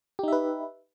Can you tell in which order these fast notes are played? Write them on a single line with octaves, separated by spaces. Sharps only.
G4 D#4 E5 B4